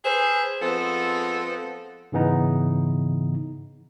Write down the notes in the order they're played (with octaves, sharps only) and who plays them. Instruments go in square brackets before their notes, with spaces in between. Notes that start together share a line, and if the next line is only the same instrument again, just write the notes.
[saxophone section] G#4 A4 B4 C5
F3 G#3 B3 C4 A4
[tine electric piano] G#2 C#3 E3 B3 D#4